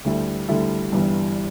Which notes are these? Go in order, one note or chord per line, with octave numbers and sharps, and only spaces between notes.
D2 D3 G3 E4 A4
D2 D3 G3 E4 A4
G1 G2 E3 G3